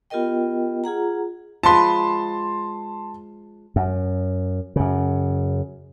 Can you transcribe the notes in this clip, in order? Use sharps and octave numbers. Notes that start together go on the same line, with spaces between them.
B3 F4 G4 A#4 D#5 G5
F4 G#4 F#5 A#5
F3 G#3 B4 A5 C6
F#2
F#2 C#3